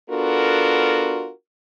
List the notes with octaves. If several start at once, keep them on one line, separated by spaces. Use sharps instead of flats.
B3 D4 F4 F#4 A4 A#4